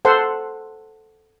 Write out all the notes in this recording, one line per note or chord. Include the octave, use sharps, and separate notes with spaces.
A4 C5 F#5 C6